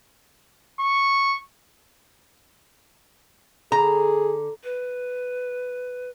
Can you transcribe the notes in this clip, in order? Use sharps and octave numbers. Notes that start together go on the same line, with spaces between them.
C#6
D3 G#4 A#5
B4